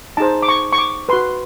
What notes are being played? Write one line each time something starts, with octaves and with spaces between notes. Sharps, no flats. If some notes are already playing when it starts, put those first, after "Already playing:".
D#4 G#4 C5 A5
D6
C#6
C#6
D6
F#4 B4 C6